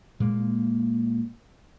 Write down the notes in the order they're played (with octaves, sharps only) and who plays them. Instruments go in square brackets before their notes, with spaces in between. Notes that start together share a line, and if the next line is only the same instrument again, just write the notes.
[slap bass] A#2 G#3 A#3